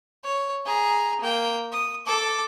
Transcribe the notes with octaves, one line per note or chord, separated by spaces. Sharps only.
C#5
G#4 A#5
A#3 G5
D#6
A4 D6